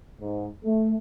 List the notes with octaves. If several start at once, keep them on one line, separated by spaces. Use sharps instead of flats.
G#2
A3